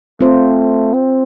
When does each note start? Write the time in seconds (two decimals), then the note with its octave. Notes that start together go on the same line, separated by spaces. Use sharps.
0.21 A3 C4 F4 C5
0.94 C4